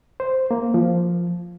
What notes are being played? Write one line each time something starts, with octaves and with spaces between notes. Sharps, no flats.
C5
A#3
F3